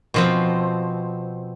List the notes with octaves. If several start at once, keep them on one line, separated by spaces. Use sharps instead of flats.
B2 F3 C4